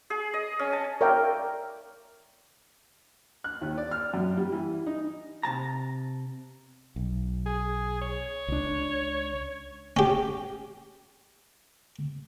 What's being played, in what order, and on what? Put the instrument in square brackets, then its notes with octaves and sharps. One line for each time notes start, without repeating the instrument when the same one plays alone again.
[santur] G#4
D#5
C#4
A5
[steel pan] A#4 C#5 D5 E5 F5 G5
[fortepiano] F#6
D#2
D5
F6
F#2
G3
E3
D#4
[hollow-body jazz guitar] C3 A5 A#5
[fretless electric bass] B1
[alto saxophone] G#4
C#5
[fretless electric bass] C#2 D4
[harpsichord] C#4 G4